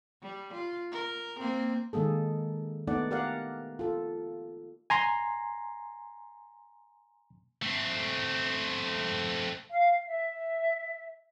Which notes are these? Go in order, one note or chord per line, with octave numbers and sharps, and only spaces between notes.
G3
F4
A#4
A#3 C4
D#3 G#3 A#3 G#4 A4
A3 B3 D#4 D5 F#5
G4 A#4 D5 F5 F#5
F4 A4
G#5 A#5 C6
A3 C4
F5
E5